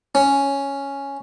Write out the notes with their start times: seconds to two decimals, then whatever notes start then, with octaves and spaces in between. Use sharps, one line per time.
0.15 C#4